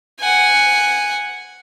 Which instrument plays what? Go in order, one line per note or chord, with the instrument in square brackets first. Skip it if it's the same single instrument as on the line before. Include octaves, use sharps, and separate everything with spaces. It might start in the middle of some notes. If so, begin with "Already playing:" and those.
[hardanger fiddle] F#5 G#5